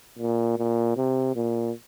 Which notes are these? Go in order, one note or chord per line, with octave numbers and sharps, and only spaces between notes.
A#2
A#2
C3
A#2